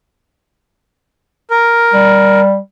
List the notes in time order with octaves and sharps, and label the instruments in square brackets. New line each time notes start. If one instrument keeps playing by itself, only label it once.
[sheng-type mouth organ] A#4
[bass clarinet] G3